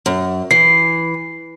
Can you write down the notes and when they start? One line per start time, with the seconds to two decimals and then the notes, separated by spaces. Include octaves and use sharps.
0.06 F#2
0.51 E3 C7